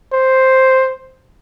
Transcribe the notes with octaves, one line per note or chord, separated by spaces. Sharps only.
C5